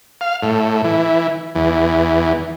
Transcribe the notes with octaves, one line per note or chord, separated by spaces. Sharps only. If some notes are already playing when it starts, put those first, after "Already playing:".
F5
A2
E3
E2